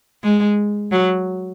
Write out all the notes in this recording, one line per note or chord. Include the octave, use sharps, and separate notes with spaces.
G#3
F#3